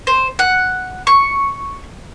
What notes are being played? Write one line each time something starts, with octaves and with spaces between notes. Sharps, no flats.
C5
F#5
C#6